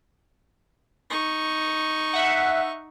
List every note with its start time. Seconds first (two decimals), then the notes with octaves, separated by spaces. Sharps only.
1.10 D#4 C#6
2.13 E5 F#5